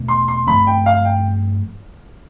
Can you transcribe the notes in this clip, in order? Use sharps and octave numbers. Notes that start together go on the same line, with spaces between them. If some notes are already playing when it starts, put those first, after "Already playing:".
Already playing: E2 B2 A3 C4
C6
C6
G2 F3 A3 C4 B5
G5
F5
G5